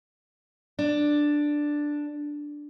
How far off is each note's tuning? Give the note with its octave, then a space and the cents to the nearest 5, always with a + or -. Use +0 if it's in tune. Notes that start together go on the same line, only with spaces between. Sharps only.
D4 +5